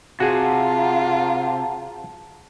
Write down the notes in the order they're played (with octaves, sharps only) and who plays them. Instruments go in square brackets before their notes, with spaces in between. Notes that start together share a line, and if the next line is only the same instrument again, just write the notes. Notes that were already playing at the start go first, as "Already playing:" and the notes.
[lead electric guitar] C3 [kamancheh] F4 [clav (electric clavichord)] F#4 G#4 [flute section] F#5 A5 A#5